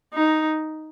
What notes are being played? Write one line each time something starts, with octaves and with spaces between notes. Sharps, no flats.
D#4